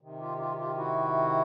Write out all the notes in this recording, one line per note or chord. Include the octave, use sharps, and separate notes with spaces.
C3 D#3
F4 G4
F4 G4
F4 G4
E4 F#4